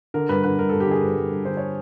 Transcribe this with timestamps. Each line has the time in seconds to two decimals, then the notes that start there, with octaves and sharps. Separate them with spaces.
0.14 D3 A#4
0.29 G2 B4
0.44 D3 B4
0.59 G2 A#4
0.69 G2 A4
0.80 G4
0.87 D3 G#4
1.02 G2 B4
1.17 G2
1.32 G2
1.45 D3 C5
1.57 C#5